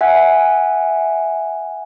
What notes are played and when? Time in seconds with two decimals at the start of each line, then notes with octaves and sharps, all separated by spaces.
0.01 E5 F#5 G#5